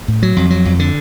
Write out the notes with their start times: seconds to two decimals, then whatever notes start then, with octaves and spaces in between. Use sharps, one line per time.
0.08 A2
0.23 F#3
0.36 F2
0.50 F#3
0.65 F2
0.79 D3